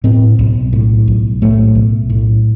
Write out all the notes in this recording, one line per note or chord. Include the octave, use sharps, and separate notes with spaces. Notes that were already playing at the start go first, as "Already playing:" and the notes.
A2 C4
B1
A2
B1
A2 A3
B1
A2